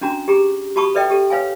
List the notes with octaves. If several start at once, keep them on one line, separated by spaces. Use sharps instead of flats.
C#4 D4 F#4 A#5
G4 G#4 A#5
F#4 G4 A5 B5 C#6 D#6
A4 B4 D5 E5 G5
G4 A4
B4 C#5 F5 G#5